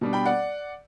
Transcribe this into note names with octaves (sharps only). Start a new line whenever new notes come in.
B2 G3 D4
G5 B5
D5 F#5